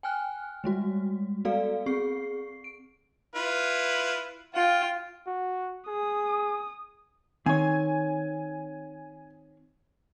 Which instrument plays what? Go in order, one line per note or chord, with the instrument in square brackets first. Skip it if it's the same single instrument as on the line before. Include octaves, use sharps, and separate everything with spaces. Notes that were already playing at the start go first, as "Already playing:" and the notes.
[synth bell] G5 G#5 F6 F#6
G3 G#3 F#4
B3 F#4 A4 D5 F5
C4 G#4 C#6 C7
D7
[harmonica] E4 F4 B4
[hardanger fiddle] F4 [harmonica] G5
[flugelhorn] F#4
[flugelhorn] G#4 [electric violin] D#6
[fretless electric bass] D#3 [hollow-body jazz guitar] C4 C#5 [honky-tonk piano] G#5